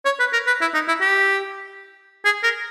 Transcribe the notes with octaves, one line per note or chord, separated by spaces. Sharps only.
C#5
B4
A#4
B4
E4
D#4
E4
G4
G#4
A#4